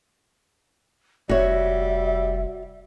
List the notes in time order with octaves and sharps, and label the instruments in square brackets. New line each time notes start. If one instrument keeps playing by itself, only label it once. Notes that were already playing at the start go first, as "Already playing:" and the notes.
[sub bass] F1 [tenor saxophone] G3 [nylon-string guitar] F#4 C#5 [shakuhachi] E5